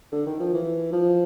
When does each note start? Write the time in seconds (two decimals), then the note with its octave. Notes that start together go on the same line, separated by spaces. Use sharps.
0.12 D3
0.26 D#3
0.39 F3
0.53 E3
0.93 F3